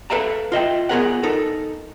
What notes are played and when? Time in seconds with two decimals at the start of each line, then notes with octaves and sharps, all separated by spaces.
0.10 A4 B4 E5 F5 A5 A#5
0.52 F4 D#5 E5 G5
0.89 B3 F4 G#4 A#4 C#5 F#5
1.23 D#4 A4 A#4